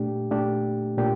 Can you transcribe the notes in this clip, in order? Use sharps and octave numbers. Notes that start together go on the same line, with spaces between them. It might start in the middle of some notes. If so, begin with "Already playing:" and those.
Already playing: A#2 A3 D4 G4
A#2 A3 D4 G4
A#2 A3 D4 G4